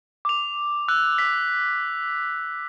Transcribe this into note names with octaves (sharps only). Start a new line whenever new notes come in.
D6 F7
E6 F#6
B6